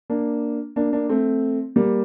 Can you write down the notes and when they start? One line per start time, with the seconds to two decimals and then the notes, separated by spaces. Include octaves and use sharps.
0.10 A#3 D4
0.76 A#3 D4
0.93 A#3 D4
1.09 A3 C4
1.76 G3 A#3